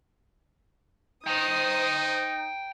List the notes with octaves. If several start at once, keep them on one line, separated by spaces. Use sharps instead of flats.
D#4 C5 G5 A#5 D#6